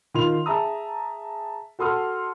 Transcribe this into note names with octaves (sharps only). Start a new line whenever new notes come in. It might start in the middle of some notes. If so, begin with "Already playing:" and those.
D#3 F4 C6 F7
G#4 E5 A5 A#5 D#6
F#4 A4 C6 D#6 F6